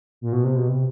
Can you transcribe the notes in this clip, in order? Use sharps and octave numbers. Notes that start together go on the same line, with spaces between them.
A#2
B2
C3
B2
C3